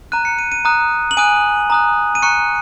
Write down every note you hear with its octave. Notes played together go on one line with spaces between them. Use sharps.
A#5 F#6 D#7
C#7
D#7
D#7
A#5 D#6 F#6
F#7
G#5 D#6 F#6 D#7
A#5 D#6 F#6
D#7
A#5 C#6 F#6 C#7